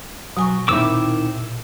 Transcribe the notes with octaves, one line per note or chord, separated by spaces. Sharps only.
B2 F#3 G#5 C#6
A#2 D#3 C4 E4 D6 E6